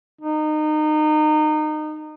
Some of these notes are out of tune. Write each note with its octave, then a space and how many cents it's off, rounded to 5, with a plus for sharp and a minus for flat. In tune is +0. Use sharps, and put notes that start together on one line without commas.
D#4 -25